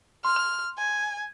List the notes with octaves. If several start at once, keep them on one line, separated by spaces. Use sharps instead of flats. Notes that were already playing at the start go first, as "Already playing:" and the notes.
C6 F6
G#5